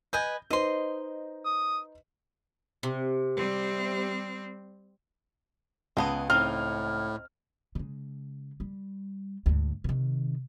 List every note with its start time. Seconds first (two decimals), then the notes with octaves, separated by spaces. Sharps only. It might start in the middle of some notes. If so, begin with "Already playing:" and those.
0.13 B4 D#5 G#5 G6
0.50 D#4 B4 C5 D#5 C6
1.45 D#6
2.83 C3
3.36 G3 C4
5.97 C#2 G#3 B3 D#5 A5
6.30 A2 C4 D#4 F6
7.75 C#3 G#3
8.60 G3
9.46 D2 G#2
9.84 C3 D#3